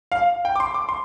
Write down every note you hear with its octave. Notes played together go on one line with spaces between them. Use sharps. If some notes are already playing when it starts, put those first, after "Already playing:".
F5
G5
D6
C6
D6
C6